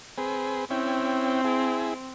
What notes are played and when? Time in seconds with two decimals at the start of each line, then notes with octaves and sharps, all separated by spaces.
0.18 C4 G#4 B4
0.71 C4 C#4 E4 G5
1.44 E4 G#4